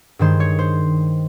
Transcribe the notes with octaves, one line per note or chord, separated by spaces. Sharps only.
G2 D#3 G#3 C5
C#5
C5